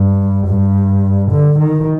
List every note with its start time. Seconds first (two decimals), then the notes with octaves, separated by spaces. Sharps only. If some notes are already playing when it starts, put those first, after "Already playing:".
Already playing: G2
0.47 G2
1.32 D3
1.59 D#3